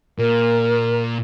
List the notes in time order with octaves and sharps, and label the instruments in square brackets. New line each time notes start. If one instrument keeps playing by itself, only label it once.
[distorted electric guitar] A#2 [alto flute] A#4